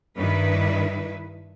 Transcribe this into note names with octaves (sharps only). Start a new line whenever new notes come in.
G2 D#3 E4 B4